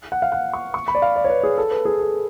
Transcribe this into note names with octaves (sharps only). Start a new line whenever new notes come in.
F#5
F5
F#5
C#6
C#6
B5
D5
F5
D5
C#5
B4
G#4
A4
B4
G#4
A4